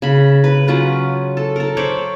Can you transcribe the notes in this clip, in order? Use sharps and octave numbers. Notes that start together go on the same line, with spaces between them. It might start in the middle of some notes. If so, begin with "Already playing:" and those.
C#3 B5
B4
F#3 C#4 F4 B4
A4
A4 A#4
C5 C#5 B5 D6